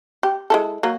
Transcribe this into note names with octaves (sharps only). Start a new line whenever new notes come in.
G4
G#3 E4 A4
F#3 A#3